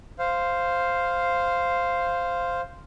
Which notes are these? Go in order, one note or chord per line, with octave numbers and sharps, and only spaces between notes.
C5 F5